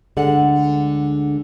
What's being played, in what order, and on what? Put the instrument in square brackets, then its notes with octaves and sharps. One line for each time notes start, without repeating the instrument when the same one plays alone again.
[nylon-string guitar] D2 D3 G#3 F#5